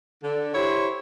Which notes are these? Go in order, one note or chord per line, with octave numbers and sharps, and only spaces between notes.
D3
E4 G4 C5 C#5